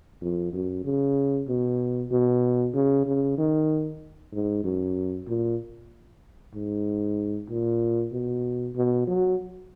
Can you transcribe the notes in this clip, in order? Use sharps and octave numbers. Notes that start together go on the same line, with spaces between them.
F2
F#2
C#3
B2
B2
C#3
C#3
D#3
G#2
F#2
A#2
G#2
A#2
B2
B2
F#3